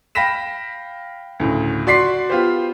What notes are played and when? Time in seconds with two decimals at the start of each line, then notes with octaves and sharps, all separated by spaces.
0.15 F5 G5 B5 A#6 B6 E7
1.40 D2 A2 C#3
1.87 F#4 D5 C6 B6 C7
2.30 B3 F4 G4 C5